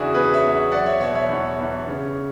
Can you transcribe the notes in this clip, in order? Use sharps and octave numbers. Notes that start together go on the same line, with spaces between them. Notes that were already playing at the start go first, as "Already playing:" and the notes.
Already playing: E2 C#3 D4 E4 F#4 G#4
E2 G#4 B4
C#5 E5
E2
F#3 D5 F#5
C#5 E5
B2 C#5 E5
C#5 E5
E2
E2
C#3